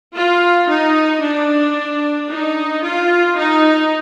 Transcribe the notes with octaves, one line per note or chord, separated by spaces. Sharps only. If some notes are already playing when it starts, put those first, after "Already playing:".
F4
D#4
D4
D#4
F4
D#4